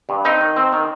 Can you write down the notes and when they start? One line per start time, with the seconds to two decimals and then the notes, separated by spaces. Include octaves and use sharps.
0.09 G2
0.25 C4 D#4 D#5
0.41 D#3
0.56 C4
0.73 D#3